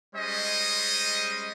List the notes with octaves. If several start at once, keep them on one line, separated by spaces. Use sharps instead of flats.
G3 G#3 C#4 C5 D#5